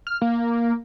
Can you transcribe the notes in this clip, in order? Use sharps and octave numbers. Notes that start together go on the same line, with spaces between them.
F6
A#3